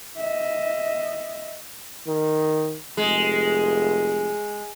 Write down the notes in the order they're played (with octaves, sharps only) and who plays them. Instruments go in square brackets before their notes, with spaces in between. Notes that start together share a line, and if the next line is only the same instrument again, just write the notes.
[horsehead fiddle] D#5 E5
[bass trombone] D#3
[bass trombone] F1 [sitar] G#3